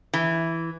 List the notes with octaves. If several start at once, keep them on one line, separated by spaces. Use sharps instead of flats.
E3